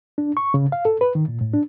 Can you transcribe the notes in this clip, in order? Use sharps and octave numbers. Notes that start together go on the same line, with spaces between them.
D4
C#6
C#3
F5
A4
B4
D#3
A#2
A2
D4